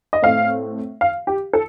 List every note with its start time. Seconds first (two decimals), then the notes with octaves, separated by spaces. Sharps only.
0.13 D#5
0.22 A2 A3 C4 F5
1.01 F5
1.27 G4
1.53 A4